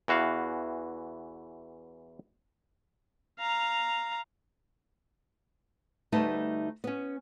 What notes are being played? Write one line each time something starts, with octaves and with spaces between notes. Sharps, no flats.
E2 E3 F#4 F5
F5 A#5
D2 G3 A3 D#4 B4 A5
B3 C#4